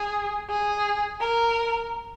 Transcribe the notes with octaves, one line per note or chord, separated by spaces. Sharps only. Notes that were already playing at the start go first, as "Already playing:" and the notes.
Already playing: G#4
G#4
A#4